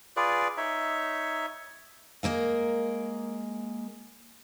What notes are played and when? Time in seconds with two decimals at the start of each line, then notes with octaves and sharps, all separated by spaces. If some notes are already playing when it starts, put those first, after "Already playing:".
0.17 F4 G#4 B4 D5
0.57 D#4 C#5 E5
2.23 G#3 A#3 A#4 F5